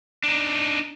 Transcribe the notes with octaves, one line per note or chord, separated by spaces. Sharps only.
D4 D#4